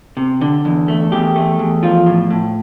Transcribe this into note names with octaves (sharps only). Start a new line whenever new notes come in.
C3
D3
E2
A3
E2 G4
A3
E2
F3 F4
A2
A2